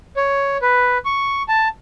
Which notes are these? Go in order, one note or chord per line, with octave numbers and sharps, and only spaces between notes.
C#5
B4
C#6
A5